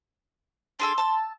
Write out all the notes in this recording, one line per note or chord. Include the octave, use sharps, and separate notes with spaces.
D4 G#4 A4 C6
A5 E6